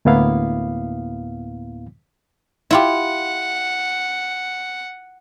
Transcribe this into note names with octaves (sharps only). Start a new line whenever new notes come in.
D2 A2 A#3 B3 E4 F5
E4 F4 G4 F#5